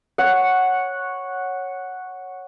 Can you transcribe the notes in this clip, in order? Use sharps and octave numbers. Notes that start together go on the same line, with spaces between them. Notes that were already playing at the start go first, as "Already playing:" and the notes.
C#5 F#5